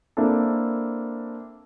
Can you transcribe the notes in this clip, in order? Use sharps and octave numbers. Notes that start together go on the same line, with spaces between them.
A#3 C4 D4 E4 A4